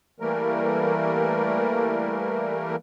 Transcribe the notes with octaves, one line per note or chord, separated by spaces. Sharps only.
E3 G3 A3 A#3 A#4